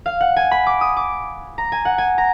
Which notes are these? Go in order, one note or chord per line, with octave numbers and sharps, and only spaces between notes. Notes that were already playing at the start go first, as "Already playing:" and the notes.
F5
F#5
G#5
B5
D6
D#6
D6
A#5
G#5
F#5
G#5
A#5